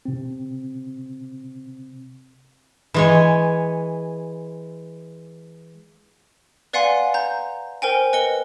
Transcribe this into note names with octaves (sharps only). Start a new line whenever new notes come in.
C3 C4
E3 G#3 C#5
B4 D5 F5 F#5 G#5 C6
A#5 G6
A#4 C5 G5 G#5
B4 D#5 C#7 G7